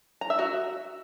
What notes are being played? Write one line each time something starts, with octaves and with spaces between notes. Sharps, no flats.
A#5
E5
F#4